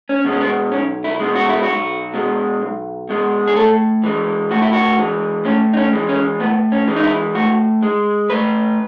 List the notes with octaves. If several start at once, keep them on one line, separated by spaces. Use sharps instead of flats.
C#4
B2 G#3
C#4
B3
B1 C#4
E4
B2 G#3
F#4
E4
B1 F#4
B2 G#3
B1
B2 G#3
G#4
A2 A4
E3 G#3
A2 F#4
E4
F#4
E3 G#3
A2 C#4
D#4
C#4
E3 G#3
C#4
A2 B3
C#4
E3 G#3
D#4
E4
A2 F#4
G#3
A2 B4